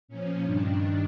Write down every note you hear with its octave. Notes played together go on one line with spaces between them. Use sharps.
A#2 F3 C#4
G2 D#3 D4